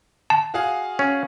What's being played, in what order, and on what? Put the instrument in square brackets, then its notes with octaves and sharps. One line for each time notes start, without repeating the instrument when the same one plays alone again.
[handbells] A5
[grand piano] F#4 G#4 F5
[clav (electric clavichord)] C#4